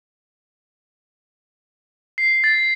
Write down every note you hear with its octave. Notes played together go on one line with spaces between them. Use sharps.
C7
A6